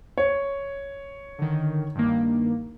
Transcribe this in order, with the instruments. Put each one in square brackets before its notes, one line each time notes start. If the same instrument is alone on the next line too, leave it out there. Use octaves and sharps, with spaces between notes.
[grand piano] C#5
[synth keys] D3 D#3
G2 D#3 A#3